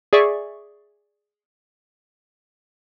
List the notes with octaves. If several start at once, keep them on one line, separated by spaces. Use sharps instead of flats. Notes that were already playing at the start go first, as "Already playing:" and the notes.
G#4 D5 E5 C#6